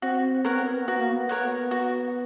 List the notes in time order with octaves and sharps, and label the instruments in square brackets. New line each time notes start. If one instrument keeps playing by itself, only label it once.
[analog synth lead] C4 [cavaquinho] F#4
[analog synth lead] B3 [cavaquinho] A#4 C#5 F#5
[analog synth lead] C4
B3
[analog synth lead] B3 [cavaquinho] F#4
[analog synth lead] A#3
B3
[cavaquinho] A#4 C#5 F#5
F#4